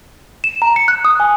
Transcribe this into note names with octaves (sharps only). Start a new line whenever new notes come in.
E7
A#5
C#7
F#6
D#6
G#5